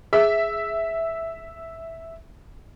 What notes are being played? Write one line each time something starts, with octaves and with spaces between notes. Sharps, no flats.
G#4 E5